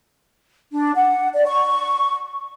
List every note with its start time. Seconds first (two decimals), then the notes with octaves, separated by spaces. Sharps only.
0.72 D4
0.95 F#5
1.34 D5
1.47 C#6